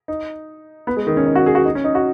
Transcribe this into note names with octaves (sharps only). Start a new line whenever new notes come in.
D#4
B3
G#3
D#3
C#4
D#4
F#4
G#4
F#4
D#4
C#4
D#4
F#4